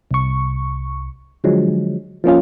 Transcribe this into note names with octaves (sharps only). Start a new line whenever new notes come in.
C2 C#6
D3 F3 F#3 G#3
F3 A#3 C#4 F4